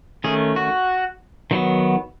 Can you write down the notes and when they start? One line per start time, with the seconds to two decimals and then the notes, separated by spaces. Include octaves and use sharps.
0.24 D#3 A3 C#4 G#4
0.56 F#4
1.51 D#3 F#3 B3